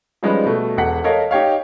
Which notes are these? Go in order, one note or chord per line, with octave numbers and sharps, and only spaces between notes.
F3 G3 G#3 C#4 D#4 B4
B2 A3
E1 A4 F#5 B6
A4 A#4 C#5 D#5 F5
D#4 G4 C#5 F5